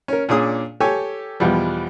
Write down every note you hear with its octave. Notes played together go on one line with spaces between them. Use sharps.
C#4 A#4
A#2 C#4 D4 G#4 D#6
G4 A4 C#5 G#5
E2 B2 F3 G3